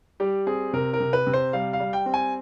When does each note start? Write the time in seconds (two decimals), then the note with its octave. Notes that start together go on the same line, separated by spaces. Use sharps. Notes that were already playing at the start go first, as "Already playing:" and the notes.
0.20 G3 G4
0.47 C4 G#4
0.73 C3 A#4
0.93 A#4
1.00 C3
1.13 B4
1.27 C3
1.33 C5
1.53 G3 F5
1.73 F5
1.80 G3
1.93 G5
2.06 C4
2.14 G#5